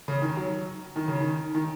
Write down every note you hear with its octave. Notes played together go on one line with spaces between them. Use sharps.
C#3
D#3
F#3
D#3
C#3
D#3
D#3